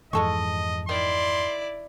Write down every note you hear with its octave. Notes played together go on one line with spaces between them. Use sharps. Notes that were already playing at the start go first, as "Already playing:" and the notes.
F2 G#2 E3 G#3 A4 D#5 C#6
D#3 E4 D5 C6